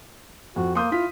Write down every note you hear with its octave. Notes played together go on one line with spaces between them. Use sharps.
F2 F#4
A#3 C6 D#6 G6
E4 F4 B6